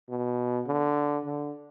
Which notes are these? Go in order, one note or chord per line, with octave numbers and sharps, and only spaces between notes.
B2
D3
D3